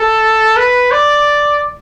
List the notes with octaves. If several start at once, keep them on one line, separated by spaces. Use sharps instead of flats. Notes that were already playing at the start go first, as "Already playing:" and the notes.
Already playing: A4
B4
D5